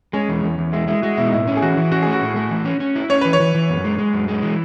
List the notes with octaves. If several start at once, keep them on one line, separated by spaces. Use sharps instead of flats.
G#3 C#4
E2
E2
E2
G#3 E4
G#3 E4
G#3 F#4
B2 E4
D#4
A2 E4
C#4
G#4
E3 F#4
E3
C#4 F#4
A3 G#4
F#4
A2
A3
E3
C#4
C#4
E4
C#4 C#5
E3 B4
C#5
E3
E3
F#2
G#3
G#3
F#2
G#3
E3